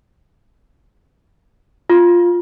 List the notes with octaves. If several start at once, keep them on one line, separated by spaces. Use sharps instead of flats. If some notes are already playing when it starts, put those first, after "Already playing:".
F4